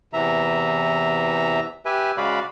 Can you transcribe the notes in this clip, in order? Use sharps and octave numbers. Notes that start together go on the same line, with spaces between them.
E2 C3 E3 E5 A#5
G4 B4 E5 G#5
C#3 G#3 F#4 D5 F5 B5